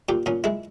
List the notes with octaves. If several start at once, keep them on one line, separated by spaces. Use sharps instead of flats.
A#2 G4
A#2 C#4
G#3 E4